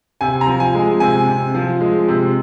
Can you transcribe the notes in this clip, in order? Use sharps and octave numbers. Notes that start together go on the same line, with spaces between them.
C3 G#5
A#5
F3
G#5
G#3
C3 G#5
C3
F3
G#3
C3